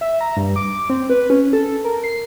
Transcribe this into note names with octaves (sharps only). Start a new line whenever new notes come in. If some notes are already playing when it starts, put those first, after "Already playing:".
E5
A#5
G2
D6
C4
B4
C#4
A4
A#4
C7